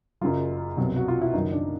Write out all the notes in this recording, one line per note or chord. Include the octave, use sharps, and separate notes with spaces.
F#1 F#2 C#3 F#3 F4
C2 B2 F#3
F#4
F4
E4
F#1 F#2 D#3 F#3 D#4
D4